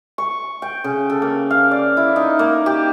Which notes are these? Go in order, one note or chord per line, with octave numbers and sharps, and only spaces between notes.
C#6
G5
C#3
A4
A#3
F5
D5
E4
D#4
A#3
G4